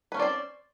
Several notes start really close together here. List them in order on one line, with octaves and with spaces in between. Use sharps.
B4 C#4 C4 D5 C5